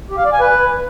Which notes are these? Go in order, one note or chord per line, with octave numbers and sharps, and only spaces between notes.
G4
F5
D5
G#5
B4